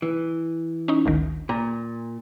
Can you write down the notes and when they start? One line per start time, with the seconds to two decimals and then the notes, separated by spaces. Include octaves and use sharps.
0.02 E3
0.88 C#4 D#4
1.05 G#1 D2 D#3
1.49 A#2 A#5